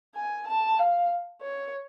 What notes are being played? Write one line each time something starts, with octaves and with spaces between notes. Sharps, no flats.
G#5
A5
F5
C#5